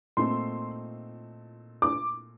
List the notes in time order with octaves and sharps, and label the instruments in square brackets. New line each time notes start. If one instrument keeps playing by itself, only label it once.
[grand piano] A#2 A3 C4 D#4 A4 [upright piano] C6
[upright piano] D6